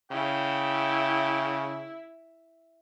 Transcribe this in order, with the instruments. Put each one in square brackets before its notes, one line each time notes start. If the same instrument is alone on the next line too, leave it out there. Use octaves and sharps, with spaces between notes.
[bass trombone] C#3 [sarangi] E4 [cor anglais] G5